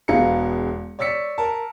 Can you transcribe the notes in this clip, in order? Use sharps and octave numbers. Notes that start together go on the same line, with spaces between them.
E1 B3 G#4 F5 A#5 C#7
C#5 D5 E6 B6 C#7
A#4 A5